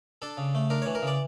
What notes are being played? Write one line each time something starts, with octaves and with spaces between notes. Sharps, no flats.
D4 A4
C#3
A3
D4 A#4
E3 C#5
A#4
C#3 D5